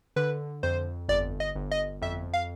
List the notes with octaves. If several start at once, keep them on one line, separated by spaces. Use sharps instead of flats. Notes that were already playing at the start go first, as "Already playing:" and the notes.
D3 B4
F2 C5
G1 D5
D#5
G1
D#5
F2 E5
F5